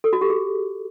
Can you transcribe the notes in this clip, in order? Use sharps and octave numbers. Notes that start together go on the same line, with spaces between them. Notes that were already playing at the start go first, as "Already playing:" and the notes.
A4
F#4
G4
G#4